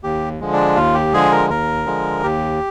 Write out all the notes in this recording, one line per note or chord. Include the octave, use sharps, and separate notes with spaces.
D#2 G4
D3 F3 G#3
D4
D#2 F4
G4
D3 F3 G#3 G#4
A#4
D#2 A#4
D3 F3 G#3
D#2 G4